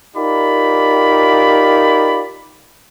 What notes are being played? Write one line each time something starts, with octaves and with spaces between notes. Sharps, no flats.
D#4 F4 G4 A#4 D5 B5